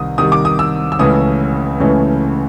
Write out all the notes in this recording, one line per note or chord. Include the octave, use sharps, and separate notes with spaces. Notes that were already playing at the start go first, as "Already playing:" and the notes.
Already playing: C2 C3 D#3 D#6
C2 C3 D#3 D#6
D6
D#6
E6
E6
C#2 C#3 E3 A3 C#4 D#6
C#2 C#3 E3 A3 C#4